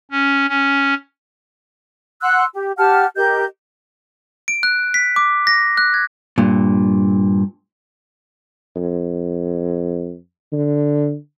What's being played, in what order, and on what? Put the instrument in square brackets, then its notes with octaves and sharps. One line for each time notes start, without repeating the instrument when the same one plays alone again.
[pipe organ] C#4
C#4
[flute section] F#5 C6 E6 F#6
G4
G4 F#5 A5 F6
G4 A#4 D#5 G6
[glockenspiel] D7
F#6
B6
D6
A#6
F#6
G#6
[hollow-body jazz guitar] G2 A#2
[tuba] F2
D3